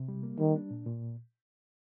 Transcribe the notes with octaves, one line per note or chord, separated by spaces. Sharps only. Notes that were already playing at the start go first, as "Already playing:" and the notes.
Already playing: C3
G3
A#3
D#3 G3
D4
A#2
A#2